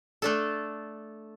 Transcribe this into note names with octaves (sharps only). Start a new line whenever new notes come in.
A3 D4 A4